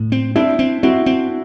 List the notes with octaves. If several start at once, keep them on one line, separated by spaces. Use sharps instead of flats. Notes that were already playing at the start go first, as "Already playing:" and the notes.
Already playing: A2
C4
C4 D4 E4
C4
C4 E4 F#4
C4